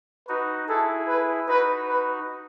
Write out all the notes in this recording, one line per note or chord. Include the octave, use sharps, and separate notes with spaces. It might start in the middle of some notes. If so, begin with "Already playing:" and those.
D#4 F#4 B4
E4 G#4 A4
B4
D#4 F#4 B4
B4